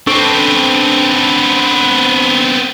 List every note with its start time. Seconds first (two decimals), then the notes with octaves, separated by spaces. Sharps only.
0.07 B3 C4 D4 A4 C#6